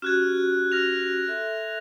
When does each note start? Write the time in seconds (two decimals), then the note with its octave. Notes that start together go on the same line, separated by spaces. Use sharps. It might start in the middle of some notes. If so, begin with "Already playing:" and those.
0.02 C#4 F#4 G4 F6 F#6 G#6
0.72 F6 A#6 F7
1.28 A4 E5 C6